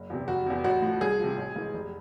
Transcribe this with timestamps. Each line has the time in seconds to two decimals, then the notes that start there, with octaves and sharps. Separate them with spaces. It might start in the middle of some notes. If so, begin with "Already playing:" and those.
Already playing: F#1
0.10 E2 C3
0.28 F1 F#4
0.46 E2 C3
0.64 A1 F#4
0.82 A2 F3
1.01 C2 G#4
1.19 C3 F3
1.38 A1
1.56 G#2 E3
1.74 F1